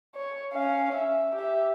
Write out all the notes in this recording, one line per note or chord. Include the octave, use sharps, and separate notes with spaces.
C#5
C#4 F5
E5
G4 E5